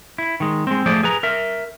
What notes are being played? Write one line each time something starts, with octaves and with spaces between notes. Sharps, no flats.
E4
D#3 G#3
G#3 C4
F3 A3 G#4 C5 D5
G#4 B4 A#5
A#4 E5